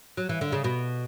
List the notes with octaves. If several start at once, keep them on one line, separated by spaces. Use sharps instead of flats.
F#3
E3
D3
C#3
B2